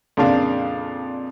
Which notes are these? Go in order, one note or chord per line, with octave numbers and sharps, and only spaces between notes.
F2 A#2 C#3 D4 F5